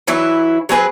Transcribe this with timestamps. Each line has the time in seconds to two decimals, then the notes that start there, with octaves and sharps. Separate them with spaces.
0.07 E3 F#3 E4 B4
0.69 F#3 C4 G#4 B4